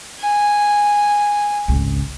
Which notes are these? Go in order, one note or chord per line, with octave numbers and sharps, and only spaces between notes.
G#5
G#1 C#2